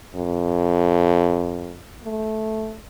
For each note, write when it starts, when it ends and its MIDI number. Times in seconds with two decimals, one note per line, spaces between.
0.16 1.78 41
2.03 2.76 57